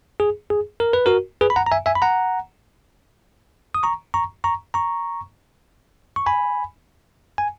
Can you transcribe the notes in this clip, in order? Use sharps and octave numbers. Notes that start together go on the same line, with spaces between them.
G#4
G#4
A#4
B4
F#4 A#4
G#4 B4
B5
F#5 A#5
A#5
E5 G#5
E5 G#5
B5
F#5 A#5
D#6
A#5 C#6
A#5 C#6
A#5 C#6
A#5 C#6
C#6
G#5 B5
G#5